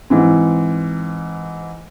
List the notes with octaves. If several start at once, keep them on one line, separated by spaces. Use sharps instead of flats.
G#2 E3 C4